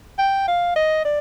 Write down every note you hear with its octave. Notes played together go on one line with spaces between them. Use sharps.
G5
F5
D#5
D5